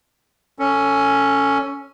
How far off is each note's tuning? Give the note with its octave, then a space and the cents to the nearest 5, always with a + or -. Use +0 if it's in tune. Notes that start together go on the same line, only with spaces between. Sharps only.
C#4 +5 A4 +15